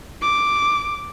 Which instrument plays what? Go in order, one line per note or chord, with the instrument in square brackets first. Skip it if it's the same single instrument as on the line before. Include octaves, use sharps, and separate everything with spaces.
[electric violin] D6